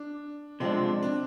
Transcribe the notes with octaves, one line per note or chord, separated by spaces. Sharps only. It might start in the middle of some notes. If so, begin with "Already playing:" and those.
Already playing: D4
C3 F3 G#3 C4 D4
D4